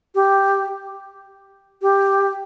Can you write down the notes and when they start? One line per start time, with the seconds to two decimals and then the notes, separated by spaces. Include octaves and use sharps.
0.15 G4
1.82 G4